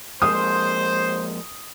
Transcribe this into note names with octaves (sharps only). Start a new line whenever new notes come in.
F3 G#3 A#3 C5 D#6